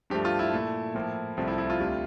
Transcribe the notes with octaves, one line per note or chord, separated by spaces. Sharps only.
G2 F3 A3 G4
F4
E4
A#2 A3
A2 F3 A#3
C2 C3 F3 A3
E4
E4
F4
D2 C3 G3